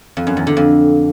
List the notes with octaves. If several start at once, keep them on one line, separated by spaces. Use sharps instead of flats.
F2
F#2
E2
D3
F2